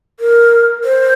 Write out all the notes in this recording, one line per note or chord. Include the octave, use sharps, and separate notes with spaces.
A#4
C5